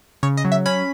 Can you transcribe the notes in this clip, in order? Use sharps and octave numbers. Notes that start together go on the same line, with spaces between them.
C#3 C#5
D#5
F#3
E5
C#4 B5